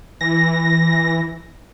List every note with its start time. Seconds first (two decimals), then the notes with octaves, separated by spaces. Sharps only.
0.21 E3 A#6